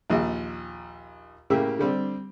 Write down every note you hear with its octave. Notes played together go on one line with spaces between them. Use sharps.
A#1 D#2
A2 C#3 A#3 G4 E5
D3 G3 C4